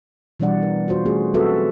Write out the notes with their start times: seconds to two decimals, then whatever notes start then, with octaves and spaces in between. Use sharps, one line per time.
0.40 B2 E3 G3 D4 D5 F#5
0.63 A#4
0.88 F4 F#4 C5
1.05 A3 C#4 F#4 G#4
1.34 F#3 C4 F#4 A4 B4 E5